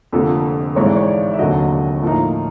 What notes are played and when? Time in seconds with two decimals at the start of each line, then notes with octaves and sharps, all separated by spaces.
0.13 F1 F2 D3 F3 A#3 A4
0.75 G#1 G#2 E3 C#5
0.86 D5
0.96 C#5
1.08 D5
1.33 E5
1.39 F1 D#2 D3 F#3 D#5
2.03 A2 F3 A#3 D#4